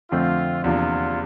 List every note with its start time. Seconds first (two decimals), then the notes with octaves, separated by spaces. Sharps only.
0.11 F2 D3 F3 A3 C4 F4
0.64 E2 C3 F3 A#3 D4 F4